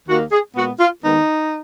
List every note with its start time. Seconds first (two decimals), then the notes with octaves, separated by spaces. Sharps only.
0.08 D#2 D#3 A#3 F#4
0.31 G#4
0.56 A#2 G#3 B3 F#4
0.79 F4
1.03 D#2 D#3 G#3 B3 D#4